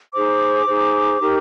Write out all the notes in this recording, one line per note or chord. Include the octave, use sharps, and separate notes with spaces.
D#4 G#4 C5 D6
D#4 G#4 C5
D#4 G4 A#4